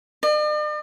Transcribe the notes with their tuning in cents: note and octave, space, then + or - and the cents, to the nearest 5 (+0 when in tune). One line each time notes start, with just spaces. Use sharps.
D5 +45